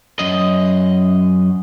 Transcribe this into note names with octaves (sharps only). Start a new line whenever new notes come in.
F#2 D#5